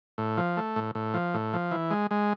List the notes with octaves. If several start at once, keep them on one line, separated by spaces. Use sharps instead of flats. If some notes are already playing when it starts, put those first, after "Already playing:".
A2
F3
A3
A2
A2
F3
A2
F3
E3
G#3
G#3